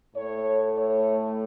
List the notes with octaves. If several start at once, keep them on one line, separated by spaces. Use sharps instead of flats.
A2 A3 C#5
C#5